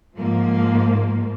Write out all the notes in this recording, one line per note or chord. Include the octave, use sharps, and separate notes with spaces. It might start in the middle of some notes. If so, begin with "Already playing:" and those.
G#2 F3 A#3